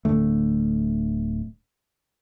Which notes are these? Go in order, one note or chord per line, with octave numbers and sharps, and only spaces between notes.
D1 F2 D3 A3